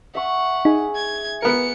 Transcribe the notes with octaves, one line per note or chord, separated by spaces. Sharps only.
E5 F#5 C#6
D#4 G#4
G#6
B3 A#4 C#7